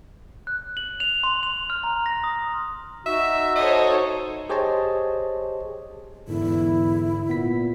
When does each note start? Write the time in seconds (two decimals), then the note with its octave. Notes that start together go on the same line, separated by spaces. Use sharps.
0.47 F#6
0.77 F#7
1.00 F7
1.24 C6
1.43 F7
1.70 F6
1.84 A#5
2.06 A#6
2.24 D#6
3.06 D#4 F#4 E5
3.56 A4 C5 C#5 D#5
4.49 G4 G#4 C5 C#5 D#5 A5
6.28 E2 G#2 D3 E4
7.29 A#2 B3 B6